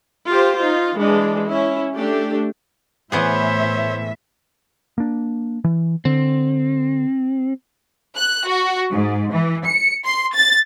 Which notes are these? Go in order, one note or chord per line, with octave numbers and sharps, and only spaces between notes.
F4 G4 C5
D#4 F4
E3 G#3 D4
C#4 E4
A3 D4 G4
A2 E3 B3 G#4 C5 C#5 E5
A#3 D4
E3
D3 C4
F#6
F#4
G#2
E3
C#7
C6
A6